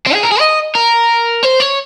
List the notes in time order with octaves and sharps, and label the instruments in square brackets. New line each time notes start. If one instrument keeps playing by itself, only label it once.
[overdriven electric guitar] C4
G#4
A#4
G#4
D#5
A#4
C5
C#5